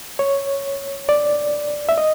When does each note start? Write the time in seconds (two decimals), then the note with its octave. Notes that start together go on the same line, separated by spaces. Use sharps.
0.19 C#5
1.09 D5
1.89 E5
1.98 D#5